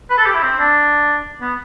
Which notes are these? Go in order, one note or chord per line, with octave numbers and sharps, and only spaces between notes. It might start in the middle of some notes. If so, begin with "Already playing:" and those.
B4
A4
G4
E4
C4
D4
B3